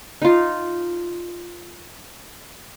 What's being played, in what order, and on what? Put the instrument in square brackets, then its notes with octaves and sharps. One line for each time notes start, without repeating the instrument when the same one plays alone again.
[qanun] D#4 F4